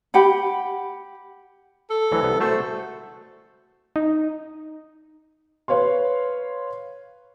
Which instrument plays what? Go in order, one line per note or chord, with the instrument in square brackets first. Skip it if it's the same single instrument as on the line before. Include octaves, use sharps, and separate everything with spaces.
[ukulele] G4 F#5 B5
[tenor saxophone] A4
[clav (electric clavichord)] D2 E3 F#3
C2 B3
[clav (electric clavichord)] A3 A4 C5 [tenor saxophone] F#4
[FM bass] D#4
[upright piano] B4 C#5 F5 C6